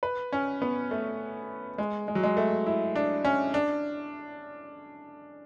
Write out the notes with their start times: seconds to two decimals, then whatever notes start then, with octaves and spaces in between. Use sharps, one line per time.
0.03 B4
0.33 C#4
0.62 B3
0.91 A3
1.78 G#3
2.08 G#3
2.15 F#3
2.23 G#3
2.37 A3
2.67 E4
2.96 D4
3.25 C#4
3.54 D4